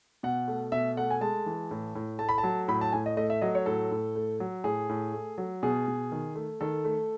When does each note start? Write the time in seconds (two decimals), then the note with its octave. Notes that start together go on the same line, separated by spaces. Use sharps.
0.23 B2 F#5
0.48 A3
0.72 B2 E5
0.97 A3 F#5
1.11 G#5
1.21 G#3 A5
1.46 E3
1.71 A2
1.95 A2
2.19 A3 A5
2.29 B5
2.38 A5
2.43 F#3
2.68 A2 B5
2.81 A5
2.92 A2 G#5
3.06 D#5
3.17 A3 D#5
3.30 E5
3.41 F#3 D#5
3.55 C#5
3.66 A2 A4
3.91 A2
4.15 A3
4.40 F#3
4.64 A2 G#4
4.89 A2
5.13 A3
5.38 F#3
5.63 B2 G#4
5.88 B2
6.12 D#3
6.36 A3
6.61 D#3 A4
6.85 A3